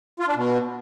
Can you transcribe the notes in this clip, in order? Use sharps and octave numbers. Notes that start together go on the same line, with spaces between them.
F4
D4
B2